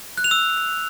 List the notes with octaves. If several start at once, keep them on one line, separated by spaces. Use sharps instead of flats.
F#6
F7
E6